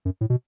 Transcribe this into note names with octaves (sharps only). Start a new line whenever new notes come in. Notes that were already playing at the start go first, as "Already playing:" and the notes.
F#2
A2
B2